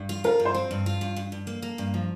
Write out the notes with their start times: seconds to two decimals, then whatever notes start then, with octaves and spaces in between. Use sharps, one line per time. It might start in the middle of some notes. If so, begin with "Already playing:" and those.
Already playing: G2
0.09 F4
0.24 F4 A#4
0.40 G2
0.45 C5
0.55 C4
0.71 G2
0.86 F4
1.01 G2
1.16 G2
1.32 G2
1.47 A#3
1.62 A#3
1.78 G2
1.94 F3